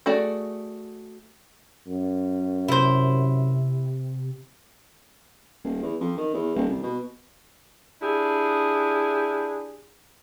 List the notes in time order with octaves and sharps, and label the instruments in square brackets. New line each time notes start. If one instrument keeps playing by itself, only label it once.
[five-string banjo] A3 F#4 G#4 D5
[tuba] F#2
[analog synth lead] C3 [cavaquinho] E4 C5
[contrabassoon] D#1
E2
F2
D#3
E2
D#1
C2
B2
[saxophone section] D4 E4 G4 G#4